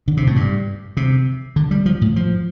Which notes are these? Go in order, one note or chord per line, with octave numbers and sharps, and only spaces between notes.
D3
C3
A2
G2
C3
D3
G3
F3
A2
F3